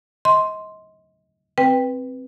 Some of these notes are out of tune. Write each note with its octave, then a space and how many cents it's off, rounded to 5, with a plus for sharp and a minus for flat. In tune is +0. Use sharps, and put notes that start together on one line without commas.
D#5 +30 C6 +0
C4 +0 B4 +0 G5 +10